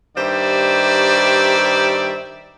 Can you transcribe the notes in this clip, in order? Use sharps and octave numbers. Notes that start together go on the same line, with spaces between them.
G2 D#3 G4 C5 D5 E5